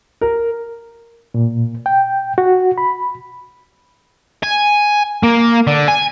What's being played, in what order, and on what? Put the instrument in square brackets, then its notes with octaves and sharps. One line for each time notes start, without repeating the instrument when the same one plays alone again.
[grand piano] A#4
[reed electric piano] A#2
G5
F#4
B5
[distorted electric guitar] G#5
A#3
D3
G#5